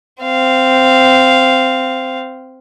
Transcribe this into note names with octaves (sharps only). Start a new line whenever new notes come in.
C4 F5